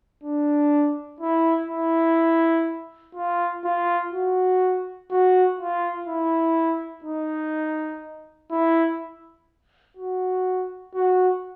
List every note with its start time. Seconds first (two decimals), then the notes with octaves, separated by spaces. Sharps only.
0.24 D4
1.20 E4
1.69 E4
3.15 F4
3.64 F4
4.13 F#4
5.10 F#4
5.59 F4
6.07 E4
7.04 D#4
8.51 E4
9.97 F#4
10.94 F#4